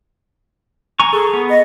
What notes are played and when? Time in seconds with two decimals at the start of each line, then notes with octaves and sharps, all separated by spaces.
1.00 G#5 A#5 C#6
1.13 G#4 A4
1.34 B3
1.49 D#5